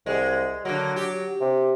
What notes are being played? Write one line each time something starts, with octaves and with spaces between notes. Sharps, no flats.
C2 G#3
D3 F#3 A#3
G4
C3